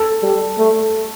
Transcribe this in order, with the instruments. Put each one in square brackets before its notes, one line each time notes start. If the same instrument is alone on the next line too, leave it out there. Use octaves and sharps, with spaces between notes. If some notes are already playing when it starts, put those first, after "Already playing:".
Already playing: [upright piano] A4
[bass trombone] G3
A3